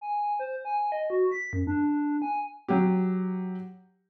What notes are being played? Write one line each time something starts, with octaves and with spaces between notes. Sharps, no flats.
G#5
C5
G#5
D#5
F#4
B6
F#2
D4
G#5
F#3 G4